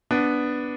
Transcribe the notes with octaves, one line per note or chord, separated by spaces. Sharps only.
B3 D4